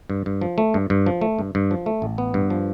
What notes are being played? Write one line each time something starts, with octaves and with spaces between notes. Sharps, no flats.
G2
G2
F3
A3
G2
G2
F3
A3
G2
G2
F3
A3
A1
B3
G2
F3